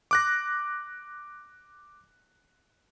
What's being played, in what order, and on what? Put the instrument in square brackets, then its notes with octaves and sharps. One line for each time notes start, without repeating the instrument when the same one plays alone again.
[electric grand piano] D6 F#6 A#6